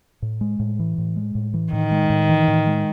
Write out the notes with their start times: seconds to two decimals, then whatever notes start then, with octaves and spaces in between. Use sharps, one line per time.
0.22 A2
0.41 G#3
0.59 A2
0.79 E3
0.98 A2
1.16 G#3
1.35 A2
1.54 E3
1.73 A2 D#3
1.91 G#3
2.10 A2
2.29 E3
2.48 A2
2.67 G#3